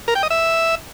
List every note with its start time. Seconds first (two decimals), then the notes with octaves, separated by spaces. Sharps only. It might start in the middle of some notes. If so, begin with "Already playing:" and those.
0.08 A#4
0.15 G5
0.23 D#5
0.30 E5